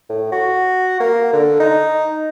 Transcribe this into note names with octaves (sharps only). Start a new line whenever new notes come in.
A2
F#4
A#3
D3
D#4